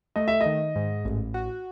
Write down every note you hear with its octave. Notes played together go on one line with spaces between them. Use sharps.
A3 D#5
E5
D#3 D#5
G#2
A1
F#4